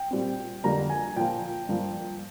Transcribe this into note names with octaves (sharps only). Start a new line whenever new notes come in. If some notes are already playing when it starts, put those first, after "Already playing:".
Already playing: G5
A#2 G3 C4
F2 D3 G3 A#3 A#5
G#5
A#2 F3 A#3 G5
G2 F3 A#3